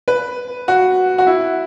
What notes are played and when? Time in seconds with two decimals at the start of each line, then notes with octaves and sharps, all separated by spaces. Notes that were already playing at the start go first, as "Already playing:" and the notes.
0.08 B4
0.68 F#4
1.18 F#4
1.27 E4